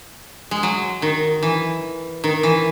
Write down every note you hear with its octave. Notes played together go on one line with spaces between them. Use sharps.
G#3
F#3
D#3
E3
D#3
E3